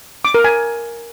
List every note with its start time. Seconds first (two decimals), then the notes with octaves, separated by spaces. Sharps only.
0.25 D6
0.34 A#4
0.44 G#5